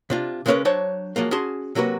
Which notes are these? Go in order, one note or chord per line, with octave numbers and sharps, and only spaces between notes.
C3 D4 F4
C#3 G#3 B3 C#4 A#4 B4
F#3 D4 C5 C#5 A5
F3 F#3 G#3 A#3
C#4 F#4 G#4 A5 C6
C3 F#3 A#3 F#4 B4